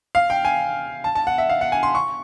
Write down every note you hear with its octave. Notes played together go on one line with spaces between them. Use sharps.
F5
G5
G#5
A5
A5
F#5
E5
F5
F#5
G#5
C6
C#6